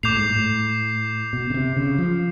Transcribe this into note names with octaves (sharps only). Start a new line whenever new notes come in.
A2 D6 G6 C7 F7
G#2
A2
B2
C#3
C3
C#3
F3